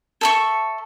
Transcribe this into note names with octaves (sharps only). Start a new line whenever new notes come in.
A4 E5 C#6